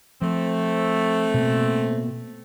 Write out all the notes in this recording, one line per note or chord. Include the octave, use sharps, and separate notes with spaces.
F3 A3 C4
B2 A#3